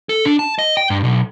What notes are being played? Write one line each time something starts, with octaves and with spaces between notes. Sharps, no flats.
A4
D4
A5
D#5
G5
G2
B1